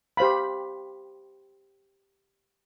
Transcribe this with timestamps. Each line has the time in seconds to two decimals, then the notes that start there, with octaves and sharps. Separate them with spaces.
0.17 G4 C5 F5 B5